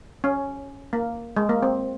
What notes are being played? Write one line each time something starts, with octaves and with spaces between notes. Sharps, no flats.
C#4
A#3
G#3
A#3
C4